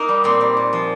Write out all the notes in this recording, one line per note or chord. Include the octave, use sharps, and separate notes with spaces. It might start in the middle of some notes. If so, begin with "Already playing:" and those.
Already playing: A#3 D#4
G3
A#2 C4
G3
A#2
F3